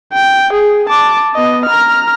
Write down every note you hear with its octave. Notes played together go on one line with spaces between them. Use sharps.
G5
G#4
A5 D6
B3 D#5
A#5 F6